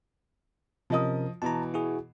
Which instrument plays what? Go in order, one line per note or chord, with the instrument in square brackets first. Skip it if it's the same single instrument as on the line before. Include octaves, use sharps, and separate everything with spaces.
[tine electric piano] C3 C#4 A#4 [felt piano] F3 D#5 D#6
[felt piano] B2 E3 [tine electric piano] A5 A#5
[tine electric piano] E4 F#4 G#4